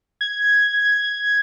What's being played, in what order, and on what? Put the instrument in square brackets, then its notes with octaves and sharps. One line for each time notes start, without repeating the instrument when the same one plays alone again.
[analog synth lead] G#6